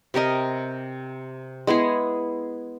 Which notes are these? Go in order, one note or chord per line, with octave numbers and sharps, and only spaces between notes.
C3 G4 A#4 D#5
G#3 B3 E4 G#4